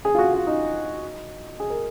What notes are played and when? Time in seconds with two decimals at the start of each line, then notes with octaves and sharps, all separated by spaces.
0.05 G#4
0.15 F4
0.19 F#4
0.33 F4
0.47 D#4
1.60 G#4
1.70 A#4